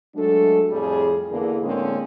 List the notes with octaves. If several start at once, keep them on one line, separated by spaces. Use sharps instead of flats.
F#3 G#3 A3 D4 A4
F2 A2 G3 G#4
E2 D3 E3 A#3 G#4
A2 D3 G#3 A#3 C4 C#4